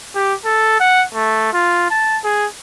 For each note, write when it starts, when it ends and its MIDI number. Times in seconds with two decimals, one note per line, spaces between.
0.15 0.34 67
0.45 0.76 69
0.80 1.04 78
1.15 1.49 57
1.53 1.88 65
1.91 2.19 81
2.24 2.47 68